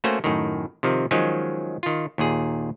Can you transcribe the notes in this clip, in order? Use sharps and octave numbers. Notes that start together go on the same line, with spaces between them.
A3 A#3 C#4 F#4 C5
F#2 A2 D#3
C3 D#3 F3
D#3 F3 F#3 G#3 C#4
D#3 F4
D#2 A#2 G#4